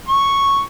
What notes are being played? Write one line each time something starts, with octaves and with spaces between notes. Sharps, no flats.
C#6